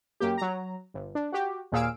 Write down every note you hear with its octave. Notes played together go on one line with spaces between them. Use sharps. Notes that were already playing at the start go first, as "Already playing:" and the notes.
F#2 A#3 G4
F#3 A#5
G1
D4
F#4 G4
D#2 A#2 G#4 F5 E6 D7